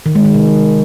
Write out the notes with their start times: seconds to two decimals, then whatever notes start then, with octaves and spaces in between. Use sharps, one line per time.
0.06 D#3
0.15 G#3
0.25 D#3
0.34 C3